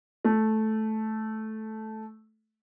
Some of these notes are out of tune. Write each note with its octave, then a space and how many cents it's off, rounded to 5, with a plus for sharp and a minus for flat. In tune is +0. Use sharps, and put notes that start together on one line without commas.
A3 -10